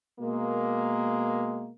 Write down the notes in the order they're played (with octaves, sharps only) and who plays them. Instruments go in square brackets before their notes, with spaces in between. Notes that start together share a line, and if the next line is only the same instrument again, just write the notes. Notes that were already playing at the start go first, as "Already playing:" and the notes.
[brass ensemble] B2 G#3 A#3